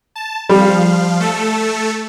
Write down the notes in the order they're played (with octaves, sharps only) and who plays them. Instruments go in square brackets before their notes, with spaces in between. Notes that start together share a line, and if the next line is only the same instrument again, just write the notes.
[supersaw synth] A5
[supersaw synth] F3 F5 [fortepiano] G3
[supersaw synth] A3 A4